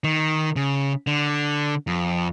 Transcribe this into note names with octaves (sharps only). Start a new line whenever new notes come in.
D#3
C#3
D3
F2